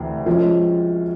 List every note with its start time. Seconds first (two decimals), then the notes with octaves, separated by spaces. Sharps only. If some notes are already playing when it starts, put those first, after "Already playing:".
Already playing: D2 C3 E3
0.26 F3 G#3 C#4